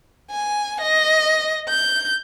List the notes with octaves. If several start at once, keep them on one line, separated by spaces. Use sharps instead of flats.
G#5
D#5
G6